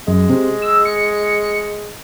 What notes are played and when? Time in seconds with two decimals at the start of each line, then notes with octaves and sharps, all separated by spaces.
0.08 F#2 G#3
0.30 C3
0.62 E6
0.85 C#7